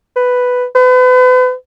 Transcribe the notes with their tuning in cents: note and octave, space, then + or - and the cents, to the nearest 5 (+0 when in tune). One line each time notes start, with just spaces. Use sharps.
B4 +5
B4 +40